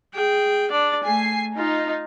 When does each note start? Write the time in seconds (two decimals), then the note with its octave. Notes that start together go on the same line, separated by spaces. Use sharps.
0.13 G#4 G5
0.71 D4 D5
1.04 A3 G#5 C7
1.57 D#4 F4